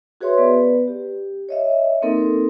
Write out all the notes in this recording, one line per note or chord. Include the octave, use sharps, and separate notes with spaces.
F#4 G#4 B4 C#5 E5 C6
B3 B4 D5
G4
C#5 D#5 E5
A#3 C4 D#4 A4 A#4